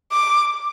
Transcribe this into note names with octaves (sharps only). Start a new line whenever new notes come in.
D6